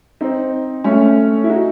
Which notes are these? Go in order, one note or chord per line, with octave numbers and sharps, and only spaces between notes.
C4 D#4
A3 C#4
E4
D#4 F#4